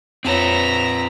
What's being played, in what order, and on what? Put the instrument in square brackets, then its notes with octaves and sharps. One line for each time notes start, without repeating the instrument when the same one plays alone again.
[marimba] F2 C#5 [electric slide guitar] C4 F4 B4 [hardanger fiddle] E5 A#5